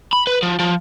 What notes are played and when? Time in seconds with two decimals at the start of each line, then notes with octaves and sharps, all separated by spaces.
0.13 B5
0.27 B4
0.42 F3
0.59 F3